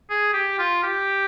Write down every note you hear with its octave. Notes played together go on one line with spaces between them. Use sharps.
G#4
G4
F4
G4